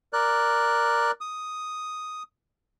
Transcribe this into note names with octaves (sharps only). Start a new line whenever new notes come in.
A#4 D5 F#6
D#6